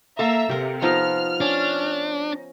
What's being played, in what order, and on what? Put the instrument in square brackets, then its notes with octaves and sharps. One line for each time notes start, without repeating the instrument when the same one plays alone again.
[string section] A#3 E5 A#5 [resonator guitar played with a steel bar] A4 F5
[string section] C3 [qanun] G4 A#4
[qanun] F3 B3 [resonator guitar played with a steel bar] D#4 [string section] F6
[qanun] C#4 [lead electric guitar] D4